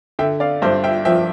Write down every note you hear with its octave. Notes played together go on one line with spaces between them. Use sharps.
D3 E5 G5
D5 F5
G2 C5 E5
E5 G5
F3 E5 G5